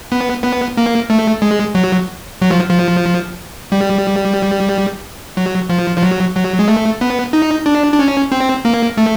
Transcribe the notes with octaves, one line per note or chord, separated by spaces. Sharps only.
B3
B3
A#3
A3
G#3
F#3
F#3
F3
F3
G3
F#3
F3
F3
F#3
F#3
G#3
A3
B3
D#4
D4
D4
C#4
C4
A#3
A3